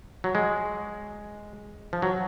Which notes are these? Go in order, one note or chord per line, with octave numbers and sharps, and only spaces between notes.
F#3
G#3
F3
F#3